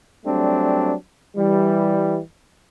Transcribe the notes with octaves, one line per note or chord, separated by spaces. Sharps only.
F#3 G3 A3 C4 D4
E3 G3